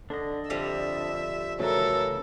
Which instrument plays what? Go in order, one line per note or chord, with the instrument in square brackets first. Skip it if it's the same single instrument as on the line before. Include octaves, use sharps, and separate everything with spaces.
[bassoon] D3 [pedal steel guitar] D4 D#5
[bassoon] F2 [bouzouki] D3 F3 G3 [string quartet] E5
[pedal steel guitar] C#3 E3 A3 [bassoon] F#3 [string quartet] A4 A#4